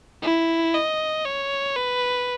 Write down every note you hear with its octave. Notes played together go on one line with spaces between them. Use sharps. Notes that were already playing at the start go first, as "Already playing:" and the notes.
E4
D#5
C#5
B4